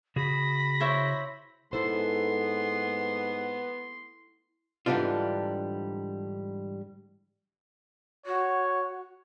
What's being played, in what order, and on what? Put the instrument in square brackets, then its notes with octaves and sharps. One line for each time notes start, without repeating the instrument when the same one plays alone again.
[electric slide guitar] C#3 F#4 G#4 [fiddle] B5 [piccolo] A#6
[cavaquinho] E4 C5 C#5
[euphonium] G#2 [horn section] B3 [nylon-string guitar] E4 A4 C5 [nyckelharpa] C6
[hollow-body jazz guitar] G#2 D3 E3 G3 D4 F4
[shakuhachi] F#4 [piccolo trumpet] C#5